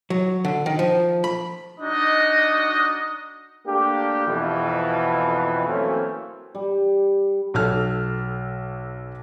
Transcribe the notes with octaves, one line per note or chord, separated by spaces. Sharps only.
F#3
D3
D#3
F3
B5
D4 D#4 F#4 D#5
A3 A#3 D4 G4
F2 B2 E3
E3 F#3 A3 A#3 C4 C#4
G3
B1 A4 F6